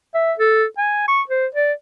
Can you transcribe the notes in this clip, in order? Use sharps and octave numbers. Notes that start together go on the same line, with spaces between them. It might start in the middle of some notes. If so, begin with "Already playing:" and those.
E5
A4
G#5
C#6
C5
D5